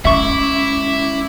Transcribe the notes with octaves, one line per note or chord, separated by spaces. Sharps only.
G#3 C#4 E4 E5 C#6 D6